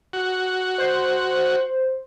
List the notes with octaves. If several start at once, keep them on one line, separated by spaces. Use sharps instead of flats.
F#4
C5